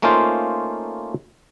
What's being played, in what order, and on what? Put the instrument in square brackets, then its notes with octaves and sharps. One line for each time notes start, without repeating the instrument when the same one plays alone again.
[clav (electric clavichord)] A3 A#3 C#4 D#4 F4 C5